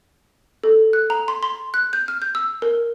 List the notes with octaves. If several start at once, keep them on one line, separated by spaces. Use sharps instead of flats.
A4
F#6
A#5
C6
C6
F#6
G6
F6
G6
E6
A#4